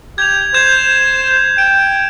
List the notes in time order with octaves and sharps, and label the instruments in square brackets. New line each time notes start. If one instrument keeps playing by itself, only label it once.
[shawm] G4 [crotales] G#6 F7
[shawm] C5 [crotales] G6 G#6 E7
[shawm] G5 [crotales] D7